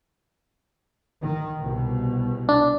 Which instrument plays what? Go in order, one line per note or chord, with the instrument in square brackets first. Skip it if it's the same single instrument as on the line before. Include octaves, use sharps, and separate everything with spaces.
[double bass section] D#3
C2 B2
[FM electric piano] D4